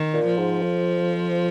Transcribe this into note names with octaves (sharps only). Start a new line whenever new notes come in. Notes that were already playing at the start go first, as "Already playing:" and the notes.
Already playing: D#3
A#2
F3
G#2
F2